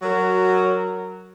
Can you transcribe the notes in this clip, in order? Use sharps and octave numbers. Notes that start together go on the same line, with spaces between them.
F#3 F#4 A#4